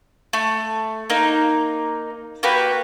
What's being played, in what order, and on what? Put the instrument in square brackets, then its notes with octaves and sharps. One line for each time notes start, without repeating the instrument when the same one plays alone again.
[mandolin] A3
A#3 D#4
A#3 F#4 G4 B4